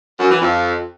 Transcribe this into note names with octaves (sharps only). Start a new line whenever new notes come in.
F#2
E3
F2